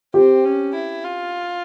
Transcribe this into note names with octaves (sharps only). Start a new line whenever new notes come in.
C4 G4
C#4
E4
F4